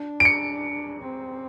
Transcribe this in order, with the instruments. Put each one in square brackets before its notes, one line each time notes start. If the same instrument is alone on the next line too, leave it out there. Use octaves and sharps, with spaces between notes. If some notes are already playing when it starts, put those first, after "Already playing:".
Already playing: [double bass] D4
[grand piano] D7
C#7
[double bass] C4